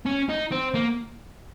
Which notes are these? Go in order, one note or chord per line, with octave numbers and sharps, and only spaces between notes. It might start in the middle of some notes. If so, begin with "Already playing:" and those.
C#4
D#4
C4
A#3